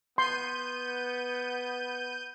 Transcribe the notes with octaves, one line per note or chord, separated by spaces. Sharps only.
B3 C6 G6 D#7